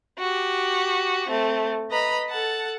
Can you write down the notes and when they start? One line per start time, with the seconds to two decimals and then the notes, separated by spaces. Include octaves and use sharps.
0.18 F#4 G4
1.28 A3 C4
1.90 B4 D#5 A#5 B5
2.29 A4 F#5 A5